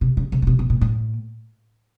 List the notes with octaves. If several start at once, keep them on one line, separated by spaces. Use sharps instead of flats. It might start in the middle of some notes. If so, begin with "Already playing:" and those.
C3
C#3
C#3
C#3
C3
B2
A#2
A2